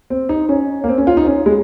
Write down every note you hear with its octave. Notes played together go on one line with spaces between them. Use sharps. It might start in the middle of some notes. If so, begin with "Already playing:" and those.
C4
D#4
C#4
A#3
C4
C#4
F4
D#4
C#4
G#3